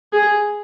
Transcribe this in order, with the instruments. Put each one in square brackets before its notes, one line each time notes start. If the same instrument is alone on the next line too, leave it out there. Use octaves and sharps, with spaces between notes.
[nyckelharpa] G#4